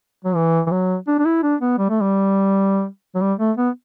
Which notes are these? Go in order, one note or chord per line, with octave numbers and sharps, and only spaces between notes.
F#3
E3
E3
F#3
D4
D4
E4
D4
B3
G3
A3
G3
F#3
G3
A3
B3